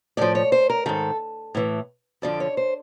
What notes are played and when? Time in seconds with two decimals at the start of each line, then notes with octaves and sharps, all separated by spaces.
0.17 A2 F3 D5
0.35 C#5
0.52 C5
0.70 A#4
0.86 G#2 D#3 A4
1.55 A2 E3
2.22 F2 D3 F3 D5
2.40 C#5
2.57 C5